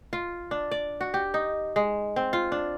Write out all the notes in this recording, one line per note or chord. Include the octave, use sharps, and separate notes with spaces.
F4
D4
D5
F#4
G4
D#4
G#3
C4
F4
D4